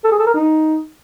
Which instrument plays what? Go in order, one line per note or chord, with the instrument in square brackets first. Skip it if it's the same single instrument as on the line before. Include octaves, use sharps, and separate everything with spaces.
[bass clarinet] A4
G#4
A4
A#4
D#4